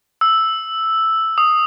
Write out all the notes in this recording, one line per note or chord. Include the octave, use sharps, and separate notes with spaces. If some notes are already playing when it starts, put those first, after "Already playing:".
E6
D#6